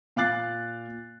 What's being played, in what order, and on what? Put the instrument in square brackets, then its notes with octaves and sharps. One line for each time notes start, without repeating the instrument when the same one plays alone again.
[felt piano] A#2 F5 D6 F#6 A6 C7